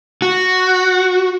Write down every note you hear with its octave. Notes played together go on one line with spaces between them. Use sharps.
F#4